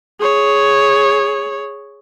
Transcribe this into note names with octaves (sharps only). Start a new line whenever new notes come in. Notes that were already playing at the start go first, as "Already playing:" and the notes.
G#4 C#5